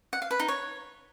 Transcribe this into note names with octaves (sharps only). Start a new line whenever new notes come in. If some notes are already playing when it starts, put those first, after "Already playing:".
F#5
F5
B4
D#4
C#5